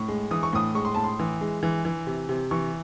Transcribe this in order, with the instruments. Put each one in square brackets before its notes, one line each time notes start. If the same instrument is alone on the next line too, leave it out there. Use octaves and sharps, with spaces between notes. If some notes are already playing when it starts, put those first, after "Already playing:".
Already playing: [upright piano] A2 C#6
G#3
E3 D#6
C#6
A2 D#6
G#3 C#6
C6
A2 A5
C6
E3
G#3
E3
E3
C3
C3
E3 C#6